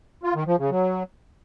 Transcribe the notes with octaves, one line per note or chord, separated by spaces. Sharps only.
F4
D#3
F3
C#3
F#3